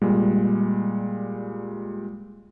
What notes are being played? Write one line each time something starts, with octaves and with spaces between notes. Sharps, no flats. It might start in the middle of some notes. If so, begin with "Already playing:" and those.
A#2 G3 G#3